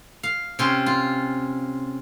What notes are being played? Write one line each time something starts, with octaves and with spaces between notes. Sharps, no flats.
F5
C3 C#4 F4 C6
F4